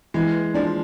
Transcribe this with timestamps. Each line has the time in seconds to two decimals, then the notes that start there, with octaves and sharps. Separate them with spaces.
0.14 E3 G#3
0.54 F3 D4